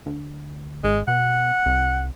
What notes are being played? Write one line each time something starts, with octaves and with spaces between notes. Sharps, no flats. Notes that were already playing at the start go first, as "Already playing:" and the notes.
D2
G#1 G#3
B2 F#5
C2